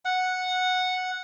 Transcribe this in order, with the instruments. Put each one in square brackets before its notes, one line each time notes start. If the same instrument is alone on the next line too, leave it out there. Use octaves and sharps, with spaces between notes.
[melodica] F#5